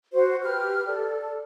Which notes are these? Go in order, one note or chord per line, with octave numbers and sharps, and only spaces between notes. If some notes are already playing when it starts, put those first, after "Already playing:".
F#4 C5
G4 B4 F6
A4 D5